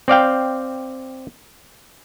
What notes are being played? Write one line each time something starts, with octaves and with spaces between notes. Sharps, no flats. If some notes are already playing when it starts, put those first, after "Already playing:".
C4 D5 F5 G5